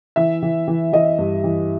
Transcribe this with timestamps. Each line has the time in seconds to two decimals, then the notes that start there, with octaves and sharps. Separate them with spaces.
0.16 E3 E5
0.43 E3
0.68 E3
0.93 E3 D#5
1.19 G2
1.44 E3